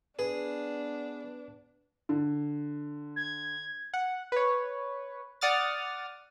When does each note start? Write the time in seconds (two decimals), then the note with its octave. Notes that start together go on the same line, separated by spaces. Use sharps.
0.19 B3 D4 G#4 B4
2.09 D3
3.16 G#6
3.94 F#5
4.32 B4 C#5
5.41 D5 F#5 D#6 F6 A6